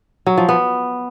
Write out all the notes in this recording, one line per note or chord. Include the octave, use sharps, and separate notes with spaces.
F#3
F3
B3